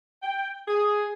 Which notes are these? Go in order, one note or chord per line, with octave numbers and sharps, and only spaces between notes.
G5
G#4